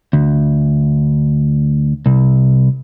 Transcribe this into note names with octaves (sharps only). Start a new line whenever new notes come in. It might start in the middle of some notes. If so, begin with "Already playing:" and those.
D2
C2